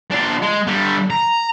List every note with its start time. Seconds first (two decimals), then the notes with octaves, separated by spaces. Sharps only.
0.11 D4 F4
0.42 G#3
0.67 D3 G3
1.10 A#5